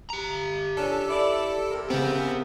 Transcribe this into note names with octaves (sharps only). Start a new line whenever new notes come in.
G4 A#5
A#2 C#4 D4 A4
E4 D5
C3 A#4
C#3 B3 C4